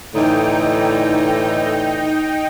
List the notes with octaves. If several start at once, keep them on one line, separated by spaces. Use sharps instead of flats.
A2 D3 E3 D#4 G5